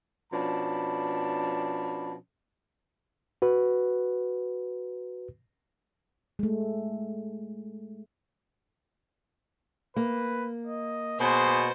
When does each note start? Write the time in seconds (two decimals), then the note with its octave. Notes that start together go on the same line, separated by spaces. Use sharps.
0.33 B2 F3 C#4 D4 A5 B5
3.42 F#4 B4
6.39 G#3 A3
9.96 A#3 B4
10.67 D#5
11.20 B2 G#4 C5